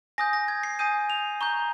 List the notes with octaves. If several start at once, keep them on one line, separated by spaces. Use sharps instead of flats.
G#5 D#6 G6 A#6
A#6
G#6
C7
G#5 D#6 G6 D#7
F7
A#5 C#6 G6 G7